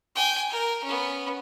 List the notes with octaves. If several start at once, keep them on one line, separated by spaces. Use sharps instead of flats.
G5 G#5
A#4
B3 C#4